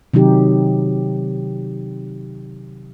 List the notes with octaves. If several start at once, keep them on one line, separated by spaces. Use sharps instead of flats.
C3 D#3 F#3 D#4 G4